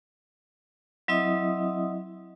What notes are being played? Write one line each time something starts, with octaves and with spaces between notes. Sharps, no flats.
F#3 C4 E4 D#5 E5 D#6